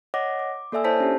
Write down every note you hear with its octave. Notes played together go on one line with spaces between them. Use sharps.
C#5 D#5 F#5 D6 A#6
D6
A#3 A4 D5 E5 G#5 E6
E4 C5 C#5 A5 G6 B6
C#4 D4 G4